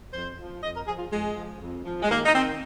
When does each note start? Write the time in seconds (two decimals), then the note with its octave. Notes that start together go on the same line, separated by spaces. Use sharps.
0.13 F2 C5
0.38 F3
0.62 F2 D#5
0.74 A#4
0.86 F3 G#4
0.99 F4
1.11 F2 G#3
1.36 F3
1.61 F2
1.85 F3
2.02 G#3
2.09 D#2 A#3
2.26 D#4
2.34 D#3 C4